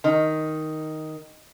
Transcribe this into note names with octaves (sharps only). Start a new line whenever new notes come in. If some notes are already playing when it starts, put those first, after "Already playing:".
D#3